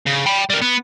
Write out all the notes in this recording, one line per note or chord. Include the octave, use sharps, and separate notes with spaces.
C#3
G5 B5
G3 A#4
B3